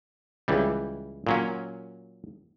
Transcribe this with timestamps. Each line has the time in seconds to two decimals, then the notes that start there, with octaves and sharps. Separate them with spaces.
0.48 C#2 E3 G3
1.27 A#2 F#3 C#4